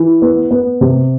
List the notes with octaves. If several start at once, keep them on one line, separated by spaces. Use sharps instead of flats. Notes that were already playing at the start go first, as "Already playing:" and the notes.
Already playing: E3
B3
B3
C3